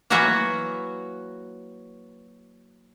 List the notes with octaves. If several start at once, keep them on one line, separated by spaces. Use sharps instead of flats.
E3 F#3 A#3 F#4 B4 E5